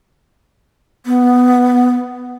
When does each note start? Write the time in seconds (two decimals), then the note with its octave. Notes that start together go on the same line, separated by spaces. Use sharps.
1.06 B3